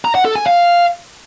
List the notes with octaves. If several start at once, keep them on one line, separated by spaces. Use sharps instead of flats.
A#5
F#5
A4
G#5
F5